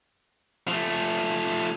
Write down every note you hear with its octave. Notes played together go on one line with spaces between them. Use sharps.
F3 A3